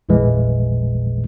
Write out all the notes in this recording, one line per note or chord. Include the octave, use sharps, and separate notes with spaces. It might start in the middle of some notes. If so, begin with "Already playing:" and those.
A1 E2 A#2 E3 G#3